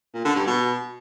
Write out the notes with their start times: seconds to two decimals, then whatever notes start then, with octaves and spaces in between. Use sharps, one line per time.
0.14 A#2
0.25 D3
0.36 G2
0.47 B2